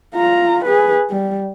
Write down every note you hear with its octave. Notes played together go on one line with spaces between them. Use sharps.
F4 A#5
G#4 B4
G3